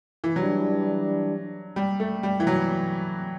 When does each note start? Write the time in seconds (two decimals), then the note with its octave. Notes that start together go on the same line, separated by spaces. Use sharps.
0.24 E3
0.36 E3 F#3 G3 D4
1.76 G3
2.00 A3
2.23 G3
2.40 E3
2.47 F#3